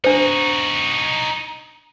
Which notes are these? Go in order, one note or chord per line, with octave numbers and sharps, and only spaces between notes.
D4 D#4 F#4 C5